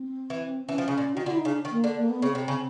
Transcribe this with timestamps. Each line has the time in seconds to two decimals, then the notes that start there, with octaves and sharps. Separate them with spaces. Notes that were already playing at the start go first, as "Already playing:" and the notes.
Already playing: C4
0.30 E3
0.68 E3 C#4
0.78 F3
0.88 C#3
0.97 A#2
1.15 D#3 F#4
1.23 F4
1.26 D3
1.31 E4
1.38 D#4
1.45 C#3 D4
1.65 D#3
1.71 A#3
1.84 D3
1.97 A#3
2.09 B3
2.22 C#3 C4
2.35 C3
2.48 C#3